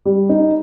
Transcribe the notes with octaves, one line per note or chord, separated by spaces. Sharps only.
G3
D#4